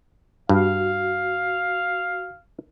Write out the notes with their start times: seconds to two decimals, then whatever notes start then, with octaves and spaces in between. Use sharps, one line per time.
0.49 G2 F#4 F5